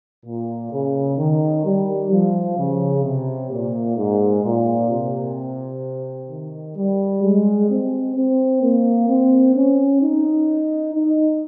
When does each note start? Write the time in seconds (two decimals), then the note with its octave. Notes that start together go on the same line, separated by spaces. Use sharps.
0.25 A#2
0.71 C#3
1.18 D#3
1.65 G3
2.11 F3
2.57 C#3
3.04 C3
3.50 A#2
3.96 G#2
4.44 A#2
4.90 C3
6.29 D#3
6.76 G3
7.22 G#3
7.69 C4
8.15 C4
8.62 A#3
9.08 C4
9.54 C#4
10.01 D#4
10.94 D#4